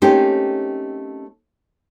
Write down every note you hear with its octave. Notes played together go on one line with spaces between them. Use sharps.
A3 A#3 C4 C#4 D#4 G4